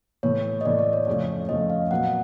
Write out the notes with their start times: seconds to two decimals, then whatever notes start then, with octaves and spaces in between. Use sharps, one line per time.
0.23 A2 E3 A3 C#5
0.61 D#5
0.65 A2 E3 A3 D5
0.79 D5
0.93 C#5
1.07 F2 C#3 F3 A3 C#4
1.49 F2 C#3 F3 A3 C#4 D#5
1.70 F5
1.90 A#2 F#3 B3 F#5